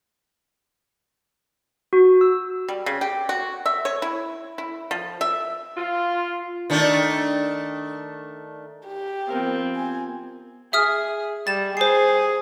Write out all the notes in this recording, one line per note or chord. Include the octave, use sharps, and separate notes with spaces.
F#4
E6
G3
C#3
G4
F#4
E5
C#5
E4
E4
F3
E5
F4
D#3 A3 D4
G4
F3 B3 C4 A#4 F5
G#5
G#4 E5 D#6 F6
G3 A6 E7
G#4 C5 C7